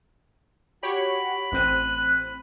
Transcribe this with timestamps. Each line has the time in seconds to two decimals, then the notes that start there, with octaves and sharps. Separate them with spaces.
0.83 F#4 G4 C#5 F#5 B5 D7
1.52 A1 C4 F#6 D#7